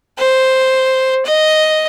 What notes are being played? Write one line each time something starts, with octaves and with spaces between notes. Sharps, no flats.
C5
D#5